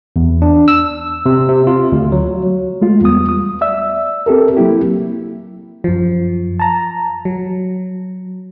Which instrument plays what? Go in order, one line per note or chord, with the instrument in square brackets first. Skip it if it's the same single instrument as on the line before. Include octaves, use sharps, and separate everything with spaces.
[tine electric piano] E2
D4
E6
C3
C3
F4
D2
F#3
[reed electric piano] G#3 A3 F4
E2 G3 B3 D#6
D#6
D5 E5 E6
C4 G4 A4 A#4
F#3 A#3 C4 E4 G4
[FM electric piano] F#2 F3
A5 A#5
F#3